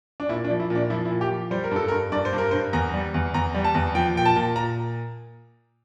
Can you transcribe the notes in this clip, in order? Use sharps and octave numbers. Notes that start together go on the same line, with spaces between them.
D4
A#2 E4
D4
F3
E4
A#2
D4
F3 E4
E4
A#2
G4
F3
G3 C5
A#4
G2 A4
A#4
G2
G2 D5
C5
G2
A#4
G2 C5
E2 A#5
G3
E2
E2 A#5
G3
A5
E2
F3 G5
A#2 G5
A5
A#2
A#2 A#5